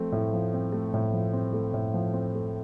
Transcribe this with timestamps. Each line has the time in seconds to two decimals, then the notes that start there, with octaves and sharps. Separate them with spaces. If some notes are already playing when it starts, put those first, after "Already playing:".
Already playing: F3 A3 C4
0.12 A2
0.33 F3
0.54 C4
0.72 A3
0.94 A2
1.13 F3
1.33 C4
1.53 A3
1.74 A2
1.94 F3
2.14 C4
2.35 A3